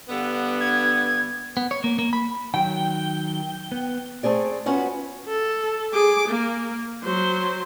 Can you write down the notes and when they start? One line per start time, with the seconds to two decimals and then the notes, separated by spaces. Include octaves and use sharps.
0.09 G2 D3 B3
0.61 G#6
1.57 B3
1.71 C#5
1.84 A#3
1.99 A#3
2.13 B5
2.54 D#3 F#3 G5
3.72 B3
4.23 A3 C4 G#4 D5
4.66 B3 C#4 F4 F#4 B4 F#5
5.28 A4
5.93 G#4 D6
6.28 A#3
7.04 F#3 C5